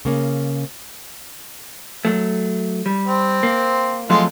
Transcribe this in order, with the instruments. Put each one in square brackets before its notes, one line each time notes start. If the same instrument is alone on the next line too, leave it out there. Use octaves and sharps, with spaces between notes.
[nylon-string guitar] C#3 A#3 C#4
[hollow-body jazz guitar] F#3 A3
G3
[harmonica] C4
[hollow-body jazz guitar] A#3
[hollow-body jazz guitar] F2 F#3 A3 [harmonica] G#3 F4